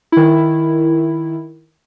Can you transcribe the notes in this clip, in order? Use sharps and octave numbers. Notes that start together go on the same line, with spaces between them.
D#3 E4